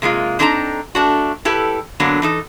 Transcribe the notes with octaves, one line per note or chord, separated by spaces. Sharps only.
C3 G#3 A#3 F4
C4 D4 D#4 A4 F5 A#5
A3 D4 F#4
E4 G4 A4 B4
D3 F#3 A#3 B3 D4
E3 D#4 A4